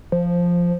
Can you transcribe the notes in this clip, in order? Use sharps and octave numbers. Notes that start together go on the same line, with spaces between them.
F3